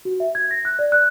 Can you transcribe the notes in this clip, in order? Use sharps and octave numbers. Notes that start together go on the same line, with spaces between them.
F#4
E5
G#6
A#6
F#6
D5
F#6